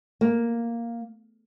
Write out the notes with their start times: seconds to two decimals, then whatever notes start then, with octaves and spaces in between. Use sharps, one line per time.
0.21 A#3